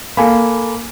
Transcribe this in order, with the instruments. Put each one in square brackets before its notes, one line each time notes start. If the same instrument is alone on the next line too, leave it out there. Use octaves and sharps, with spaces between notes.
[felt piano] A#3 [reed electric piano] A4 G#5 B5